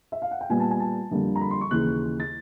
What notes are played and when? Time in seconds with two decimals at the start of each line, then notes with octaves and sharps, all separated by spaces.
0.12 E5
0.22 F5
0.31 F#5
0.41 G5
0.50 A#2 G3 B3 G#5
0.60 A5
0.71 G#5
0.80 A5
1.11 F2 D3 G3 A#3
1.36 A#5
1.41 B5
1.51 C6
1.61 C#6
1.71 D#2 C#3 E3 F#6
2.20 A6